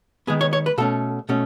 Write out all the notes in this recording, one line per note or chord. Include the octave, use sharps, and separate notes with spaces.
D#3 G#3 B3 G#4
C#5
C#5
B4
B2 A3 C#4 A4
B2 A3 C#4